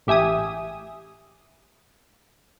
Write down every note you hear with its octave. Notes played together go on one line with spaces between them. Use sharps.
A1 G4 E5 G#5 D#6